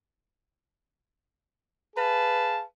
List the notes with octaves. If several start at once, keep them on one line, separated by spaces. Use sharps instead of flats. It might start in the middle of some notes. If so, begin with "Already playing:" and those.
G#4 B4 F5 A5